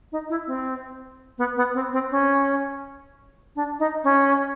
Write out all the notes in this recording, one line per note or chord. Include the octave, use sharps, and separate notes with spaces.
D#4
E4
C4
B3
B3
C4
C4
C#4
D4
D#4
C#4